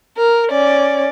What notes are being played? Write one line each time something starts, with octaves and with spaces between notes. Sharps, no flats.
A#4
C#4 D5